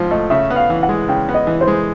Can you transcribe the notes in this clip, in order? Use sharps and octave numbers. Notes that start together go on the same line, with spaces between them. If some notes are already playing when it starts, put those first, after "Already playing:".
Already playing: G#2 F3 C4
A3 D#5
C#3 E5
B3
F5
E3
F#5
G#3
C#3 G5
B3
D#5
E3
C5
G#3